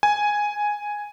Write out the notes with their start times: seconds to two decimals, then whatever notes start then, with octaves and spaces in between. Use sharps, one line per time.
0.03 G#5